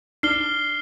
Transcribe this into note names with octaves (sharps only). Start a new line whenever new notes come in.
D4 F6 C7 G7